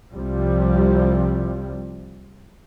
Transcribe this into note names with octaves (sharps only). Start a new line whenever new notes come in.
C2 C3 F3 G3